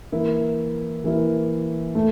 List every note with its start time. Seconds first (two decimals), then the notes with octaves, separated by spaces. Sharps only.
0.12 E3 A#3 E4 A#4
1.04 E3 A#3 E4 A#4
1.95 A3